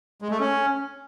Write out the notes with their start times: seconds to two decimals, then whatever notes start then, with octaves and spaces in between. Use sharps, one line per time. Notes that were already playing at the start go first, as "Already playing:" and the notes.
0.22 G#3
0.31 A3
0.40 C#4